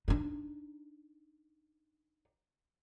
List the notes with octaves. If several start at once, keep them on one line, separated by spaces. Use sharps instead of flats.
D4 D#4